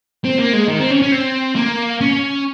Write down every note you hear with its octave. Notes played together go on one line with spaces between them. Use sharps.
C4
A#3
G#3
D#3
C4
C#4
C#4
C4
A#3
C#4